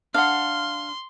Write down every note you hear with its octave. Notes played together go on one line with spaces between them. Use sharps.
D4 F5 F#5 C6